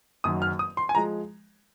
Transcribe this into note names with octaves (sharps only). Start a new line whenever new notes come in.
F#1 F#2 D#3 F#3 D#6
F6
D#6
C6
G#5
F3 G#3 A#5